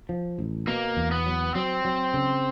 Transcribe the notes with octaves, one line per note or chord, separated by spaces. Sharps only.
F3
A1
B2 A#3
E2
B3
F#3
F#3 C4
F#3
C#3